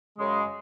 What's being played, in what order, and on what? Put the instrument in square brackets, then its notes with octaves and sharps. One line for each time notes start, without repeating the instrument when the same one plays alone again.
[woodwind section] F#2 C#3 G#3